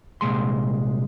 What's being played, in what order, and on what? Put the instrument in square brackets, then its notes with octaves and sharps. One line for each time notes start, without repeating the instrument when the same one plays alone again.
[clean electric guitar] C2 A#2 G#3 C6